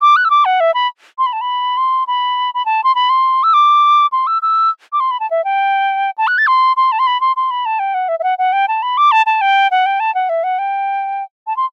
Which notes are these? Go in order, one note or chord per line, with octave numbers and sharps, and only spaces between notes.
D6
F#6
E6
D6
F#5
E5
B5
C6
B5
A5
B5
C6
B5
B5
A5
C6
B5
C6
E6
D6
C6
E6
E6
D6
C6
B5
A5
E5
G5
A5
F#6
A6
C6
C6
A5
C6
B5
C6
C6
B5
A5
G5
F#5
E5
E5
F#5
F#5
G5
A5
B5
D6
A5
A5
G5
F#5
G5
A5
F#5
E5
F#5
G5
A5
C6